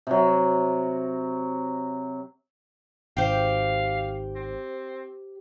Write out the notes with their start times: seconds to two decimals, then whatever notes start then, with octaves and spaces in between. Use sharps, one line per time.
0.07 C3 F#3
3.17 G#1 G4 C5 F5
4.35 C4